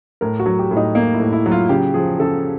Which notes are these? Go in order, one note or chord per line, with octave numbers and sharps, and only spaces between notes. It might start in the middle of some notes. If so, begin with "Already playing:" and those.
A2 A#4
F#4
F#3
G4
A2
D#4
A#3 D#4
E4
A2
E4
F#3
F4
C#3 G4
F3 G#4
C#3 A4